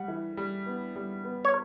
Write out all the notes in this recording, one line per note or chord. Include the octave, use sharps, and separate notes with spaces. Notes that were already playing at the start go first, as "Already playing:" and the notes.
Already playing: G3 F#5
E3
G3
B3
G3
B3
C#5